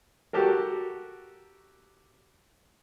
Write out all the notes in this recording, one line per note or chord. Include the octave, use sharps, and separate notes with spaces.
F#4 G4 A4 A#4